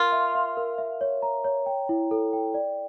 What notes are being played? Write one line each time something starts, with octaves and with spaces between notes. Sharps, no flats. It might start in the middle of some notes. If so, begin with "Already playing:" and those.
Already playing: F4 A#4
E5
E5
A#4
E5
C#5
A#5
C#5
G5
E4
A4
G5
D5